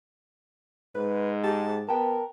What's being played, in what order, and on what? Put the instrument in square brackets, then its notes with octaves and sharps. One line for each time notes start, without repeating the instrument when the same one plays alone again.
[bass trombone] G#2 [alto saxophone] B4
[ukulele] G4 [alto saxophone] A5
[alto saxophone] B3 [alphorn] A#4 [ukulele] G5 A5